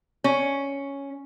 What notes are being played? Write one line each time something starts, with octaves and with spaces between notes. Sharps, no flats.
C#4